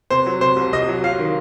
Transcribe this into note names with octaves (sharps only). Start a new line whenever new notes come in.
C3 C5
F#3
C3 C5
C2
C2 D#5
F#3
F#3 F5
D#3